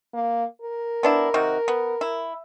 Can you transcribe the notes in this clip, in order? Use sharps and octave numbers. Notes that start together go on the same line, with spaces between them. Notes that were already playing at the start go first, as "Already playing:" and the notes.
A#3
A#4
B3 D4 E4
C3 D#3 F#4
B3
E4